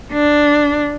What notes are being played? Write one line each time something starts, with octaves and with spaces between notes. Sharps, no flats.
D4